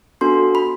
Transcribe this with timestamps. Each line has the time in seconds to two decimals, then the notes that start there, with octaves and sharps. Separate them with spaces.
0.21 B3 D4 F#4 A4 C6
0.55 B5